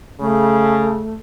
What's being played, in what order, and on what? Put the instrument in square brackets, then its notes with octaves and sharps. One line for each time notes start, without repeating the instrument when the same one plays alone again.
[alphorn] C#3 [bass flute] A3